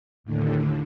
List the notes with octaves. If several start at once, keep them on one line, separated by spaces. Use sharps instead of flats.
D#2 A2 D3